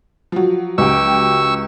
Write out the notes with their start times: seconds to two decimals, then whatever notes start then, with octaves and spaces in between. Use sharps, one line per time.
0.32 F3 F#3
0.78 C#2 G4 G5 C#6 E6